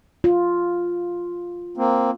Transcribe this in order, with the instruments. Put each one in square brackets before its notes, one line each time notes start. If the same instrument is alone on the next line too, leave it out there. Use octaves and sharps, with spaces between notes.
[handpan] F4
[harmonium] A#3 C4